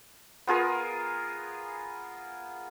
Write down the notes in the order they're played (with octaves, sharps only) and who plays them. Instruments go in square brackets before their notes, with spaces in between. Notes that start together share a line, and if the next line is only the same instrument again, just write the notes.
[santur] B3 F4 G#4 A#4